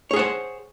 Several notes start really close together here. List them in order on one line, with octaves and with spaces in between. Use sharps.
C#5 G#4 F#5 C5